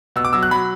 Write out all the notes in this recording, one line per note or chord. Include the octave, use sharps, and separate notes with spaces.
B2 E6
D6
F#3 E6
F#6
F#3 B5